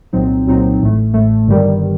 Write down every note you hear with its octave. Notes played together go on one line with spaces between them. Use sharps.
C2 A#2 F#3 C4 D#4
C2 A#2 F#3 C4 D#4
A1 A2 A3
A1 A2 A3
G1 G2 D#3 G3